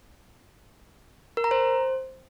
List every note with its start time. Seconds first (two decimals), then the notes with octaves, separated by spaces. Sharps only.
1.37 A#4
1.44 A#5
1.51 C5